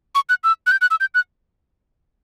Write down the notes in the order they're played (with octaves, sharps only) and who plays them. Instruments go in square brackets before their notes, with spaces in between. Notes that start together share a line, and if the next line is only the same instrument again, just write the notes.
[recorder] C#6
F#6
E6
F#6
G6
F#6
E6
G6
F#6